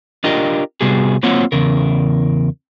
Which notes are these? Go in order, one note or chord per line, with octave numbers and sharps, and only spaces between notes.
D4 F4 G4 A#4 D#5
C3 G3 B3 F#4 G#4
F#3 A#3 C4 F4 C#5 F#5
E2 C#3 A#4